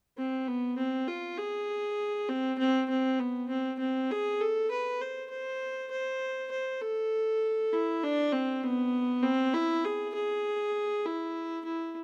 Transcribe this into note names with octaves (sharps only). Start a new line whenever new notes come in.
C4
B3
C4
F4
G#4
C4
C4
C4
B3
C4
C4
G#4
A4
B4
C5
C5
C5
C5
A4
E4
D4
C4
B3
C4
E4
G#4
G#4
E4
E4